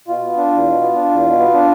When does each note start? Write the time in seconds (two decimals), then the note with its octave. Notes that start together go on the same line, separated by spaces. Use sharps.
0.08 B2 F4
0.22 B3
0.37 D4
0.51 E2
0.66 B2
0.81 B3
0.95 D4
1.10 E2
1.24 B2
1.39 B3
1.53 D4